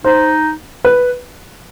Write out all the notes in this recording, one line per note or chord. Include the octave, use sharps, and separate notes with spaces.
D#4 C5
B4